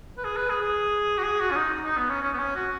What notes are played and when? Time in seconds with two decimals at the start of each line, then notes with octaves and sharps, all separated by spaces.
0.18 B4
0.25 G#4
0.37 B4
0.50 G#4
0.62 G#4
1.18 F#4
1.23 G#4
1.40 F#4
1.51 C#4
1.57 D#4
1.85 D#4
1.97 B3
2.10 C#4
2.22 C#4
2.33 B3
2.38 C#4
2.55 F#4